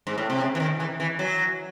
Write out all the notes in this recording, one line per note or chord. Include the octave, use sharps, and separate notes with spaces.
G#2
A2
C3
C#3
E3
D#3
E3
E3
F#3